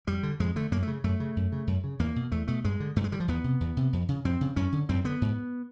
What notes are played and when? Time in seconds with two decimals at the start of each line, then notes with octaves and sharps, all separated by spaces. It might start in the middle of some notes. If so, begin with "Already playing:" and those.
0.07 F2 G3
0.23 D3
0.40 F2 G#3
0.56 D3 A3
0.72 F#2 A#3
0.83 A3
0.87 C#3
1.04 F#2 A3
1.20 C#3
1.36 F#2
1.52 C#3
1.67 F#2
1.84 C#3
1.99 E2 A#3
2.16 B2
2.31 E2 A3
2.48 B2 A3
2.64 G2 G#3
2.80 D3
2.96 G2 A3
3.04 G#3
3.12 D3 G3
3.20 F3
3.28 E2 B3
3.44 C3
3.60 E2
3.77 C3
3.93 F2
4.09 C#3
4.25 F2 C4
4.41 C#3
4.56 F#2 C#4
4.72 D3
4.89 F#2 C4
5.04 D3 B3
5.22 G#2